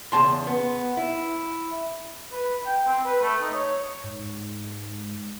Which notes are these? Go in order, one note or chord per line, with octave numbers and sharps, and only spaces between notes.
E2 C#3 A5 C6
B3
E4
B4
G5
C4
B4
A3
D#4
C#5
G#2